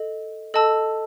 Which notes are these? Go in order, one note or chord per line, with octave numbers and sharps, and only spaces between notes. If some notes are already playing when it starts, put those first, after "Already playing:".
Already playing: A4 D#5
A4 D#5 A5 E6